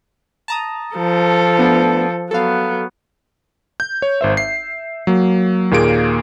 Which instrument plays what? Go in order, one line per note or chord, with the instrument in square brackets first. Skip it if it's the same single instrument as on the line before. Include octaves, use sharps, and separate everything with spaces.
[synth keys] A5 A#5 D#6
[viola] F3 A4
[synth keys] A3 B3 D4
[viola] F#3 B3 [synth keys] A4 F5
[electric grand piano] G6
C#5
G#1 C5 E5
E5 C7
F#3 A#3
D#2 A#2 A#3 G#4 D7